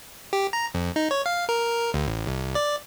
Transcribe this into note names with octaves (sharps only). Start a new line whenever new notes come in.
G4
A#5
F2
D#4
C#5
F5
A#4
D2
A1
C2
D5